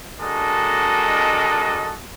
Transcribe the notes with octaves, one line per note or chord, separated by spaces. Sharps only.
G#3 D4 F#4 A4 A#4 D#5